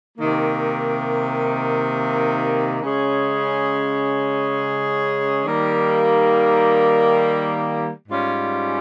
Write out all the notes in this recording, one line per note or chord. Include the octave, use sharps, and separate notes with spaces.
C3 D#3 A#3
C#3 G#3 C#4 G#4
D#3 G3 A#3
G#2 G3 C#4 F4